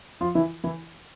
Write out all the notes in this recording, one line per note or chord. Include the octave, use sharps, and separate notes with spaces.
F3 F4
E3 E4
E3 E4